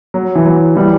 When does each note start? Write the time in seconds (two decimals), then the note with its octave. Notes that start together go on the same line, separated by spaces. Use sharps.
0.14 F#3
0.35 E3
0.45 F#3
0.76 E3 G3